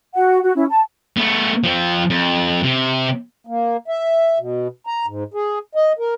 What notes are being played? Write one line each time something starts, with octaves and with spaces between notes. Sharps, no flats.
F#4 F#5
F#4
C#4 E4
A5
A3 B3
F3 C4
F2
C3
A#3
E5
B2
A#5
G#2
G#4
D#5
A#4